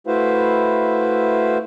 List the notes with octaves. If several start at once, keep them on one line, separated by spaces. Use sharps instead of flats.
A3 E4 F#4 B4 C5 F5